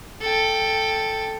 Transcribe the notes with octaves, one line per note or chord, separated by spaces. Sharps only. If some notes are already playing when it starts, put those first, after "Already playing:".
A4 G5